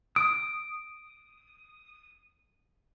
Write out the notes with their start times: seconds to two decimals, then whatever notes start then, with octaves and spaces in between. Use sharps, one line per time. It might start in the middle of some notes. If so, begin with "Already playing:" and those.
0.16 D#6 D7